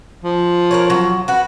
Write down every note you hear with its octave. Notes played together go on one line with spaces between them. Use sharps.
F3
A#4 B4 C#5
F#3
F#4 B4